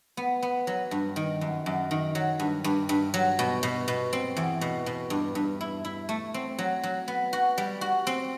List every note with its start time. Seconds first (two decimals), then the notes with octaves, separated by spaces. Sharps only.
0.17 B3
0.42 B3
0.67 F#3
0.91 G2
1.16 D#3
1.41 F#2
1.66 F#2
1.91 D#3
2.15 F#3
2.40 G2
2.64 G2
2.89 G2
3.14 F#3
3.39 B2
3.63 B2
3.88 B2
4.13 C4
4.37 E2
4.61 B2
4.86 B2
5.10 G2
5.35 G2
5.61 E4
5.85 E4
6.09 A3
6.34 C4
6.59 F#3
6.83 F#3
7.08 B3
7.33 F#4
7.58 G3
7.81 F#4
8.07 C4